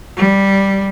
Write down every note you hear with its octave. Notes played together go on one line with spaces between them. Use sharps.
G3